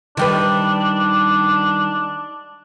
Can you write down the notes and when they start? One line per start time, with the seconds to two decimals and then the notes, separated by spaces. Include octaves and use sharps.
0.17 D#3 G3 D4 B4